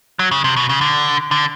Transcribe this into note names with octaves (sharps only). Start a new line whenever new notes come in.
F#3
C#3
C3
B2
C#3
D3
D3